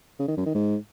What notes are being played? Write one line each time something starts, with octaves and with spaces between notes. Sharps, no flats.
C#3
D#3
F#2
D#3
G#2